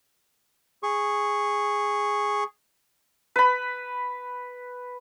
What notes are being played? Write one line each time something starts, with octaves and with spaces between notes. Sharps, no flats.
G#4 C#6
B4 B5